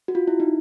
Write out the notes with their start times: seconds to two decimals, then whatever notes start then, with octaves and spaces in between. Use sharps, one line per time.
0.08 F#4
0.15 F4
0.28 E4
0.40 D#4